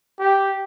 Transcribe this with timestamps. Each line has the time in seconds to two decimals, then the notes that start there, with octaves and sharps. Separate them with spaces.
0.19 G4